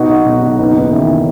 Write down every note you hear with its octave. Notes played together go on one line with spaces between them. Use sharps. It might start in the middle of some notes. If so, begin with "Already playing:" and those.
Already playing: B2 D#4 F#4
B1
B1
B1
F#1 B3 D#4
E2 B3 D#4
D#3 C#4 E4